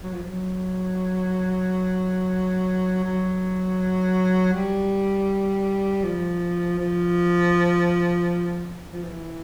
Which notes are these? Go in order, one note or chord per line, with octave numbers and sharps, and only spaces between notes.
F#3
F3
F#3
F#3
G3
F3
F3
F3
E3